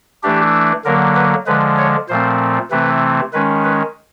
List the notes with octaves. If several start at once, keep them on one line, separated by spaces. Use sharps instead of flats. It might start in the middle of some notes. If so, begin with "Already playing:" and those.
E3 A3 D4 G4
D3 F#3 A#3 A#4
B4
D3 F3 G#3 B4
C#5
A#2 F3 A3 C4 C5
C3 E3 A3 C4 B4
D#3 G#3 C#4 B4
B4